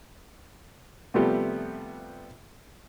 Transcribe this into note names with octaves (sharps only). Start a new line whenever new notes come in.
C3 F3 G3 A3 B3 G4